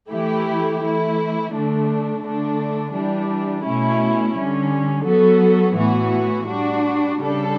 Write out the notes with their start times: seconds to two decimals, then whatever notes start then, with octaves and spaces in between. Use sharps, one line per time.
0.10 E3 A3 E4 G4
0.81 E3 A3 E4
1.52 D3 A3 D4
2.23 D3 A3 D4
2.94 E3 G3 D4
3.64 B2 A3 C#4 E4
4.35 D3 G3 C#4
5.07 F#3 B3 F#4 A4
5.77 A2 E3 B3 F#4
6.49 G3 D4 F#4
7.19 C#3 G3 D4 A4